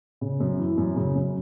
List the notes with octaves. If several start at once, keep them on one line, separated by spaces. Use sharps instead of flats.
C#3
F#2
E3
F#2
C#3
F#2